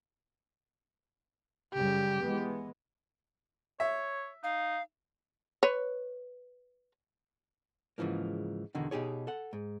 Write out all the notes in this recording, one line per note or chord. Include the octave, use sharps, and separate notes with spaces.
F#2 C#3 G3 G4
E3 G#3 B3
C#5 E5
D#4 F5
B4 C#5
G#2 C#3 E3 F3 A#3
E2 B2 D3 D#3
B2 D#4 G4 G#4 C#5
A4 F#5
G#2